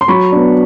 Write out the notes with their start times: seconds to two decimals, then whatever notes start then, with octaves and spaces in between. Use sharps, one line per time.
0.01 C6
0.08 F#3 B5 C#6
0.32 B3 D4